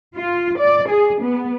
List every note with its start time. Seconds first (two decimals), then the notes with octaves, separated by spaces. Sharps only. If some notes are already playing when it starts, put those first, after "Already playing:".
0.15 F4
0.58 D5
0.89 G#4
1.22 B3